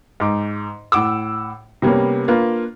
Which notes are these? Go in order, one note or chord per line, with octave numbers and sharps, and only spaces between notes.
G#2 D6
A2 F#5 D6 E6
C3 G3 A#3 B3 C#4
A#3 D4 F4 B4